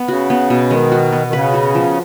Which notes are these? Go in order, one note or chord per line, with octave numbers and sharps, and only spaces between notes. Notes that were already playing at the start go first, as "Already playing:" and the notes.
Already playing: B3
C#3 F#4
B3
B2
D#3 G#3
F#4
B3
D#3
C#3 B4
F#4
F3